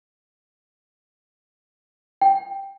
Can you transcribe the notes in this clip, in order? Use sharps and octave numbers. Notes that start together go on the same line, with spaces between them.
G5